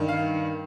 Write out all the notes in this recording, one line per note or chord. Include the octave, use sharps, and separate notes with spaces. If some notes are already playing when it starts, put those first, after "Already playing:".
Already playing: G2 D#3
F5